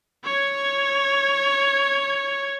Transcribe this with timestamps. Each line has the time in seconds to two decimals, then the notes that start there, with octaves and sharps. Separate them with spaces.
0.25 C#5 G#6